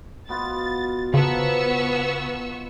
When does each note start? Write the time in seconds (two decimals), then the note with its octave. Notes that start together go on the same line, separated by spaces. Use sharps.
0.29 B2 B3 F4 A6
1.14 C#3 F3 B3 D#4 A5 C#6 E6